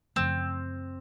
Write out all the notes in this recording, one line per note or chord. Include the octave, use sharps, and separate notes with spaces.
F#2 C#3 F3 A3 C4